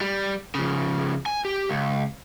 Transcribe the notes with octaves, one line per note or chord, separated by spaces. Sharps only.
G3
C#3 F3
G#5
G4
C#2